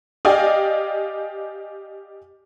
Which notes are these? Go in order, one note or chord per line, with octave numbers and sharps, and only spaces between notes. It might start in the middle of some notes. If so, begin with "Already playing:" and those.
G4 D5 D#5 F5 G5 G#5